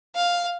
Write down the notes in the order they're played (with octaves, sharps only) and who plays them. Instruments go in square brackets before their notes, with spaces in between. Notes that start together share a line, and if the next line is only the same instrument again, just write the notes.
[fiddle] F5